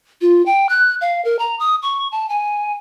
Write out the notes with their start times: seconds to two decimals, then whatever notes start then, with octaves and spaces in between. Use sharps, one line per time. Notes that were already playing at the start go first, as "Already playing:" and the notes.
0.22 F4
0.46 G5
0.69 F#6
1.01 F5
1.25 A#4
1.39 A#5
1.60 D#6
1.82 C#6
2.12 A5
2.29 G#5